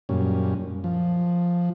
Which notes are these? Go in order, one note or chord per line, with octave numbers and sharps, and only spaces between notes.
F#2 A#2 G3 C#4
F3